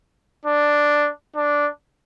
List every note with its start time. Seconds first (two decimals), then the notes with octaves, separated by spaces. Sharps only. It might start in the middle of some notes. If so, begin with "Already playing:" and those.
0.46 D4
1.36 D4